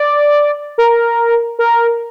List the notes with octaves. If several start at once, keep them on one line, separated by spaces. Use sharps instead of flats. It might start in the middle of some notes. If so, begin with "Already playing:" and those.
Already playing: D5
A#4
A#4